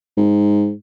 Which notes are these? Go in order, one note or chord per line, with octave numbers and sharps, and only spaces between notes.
G#2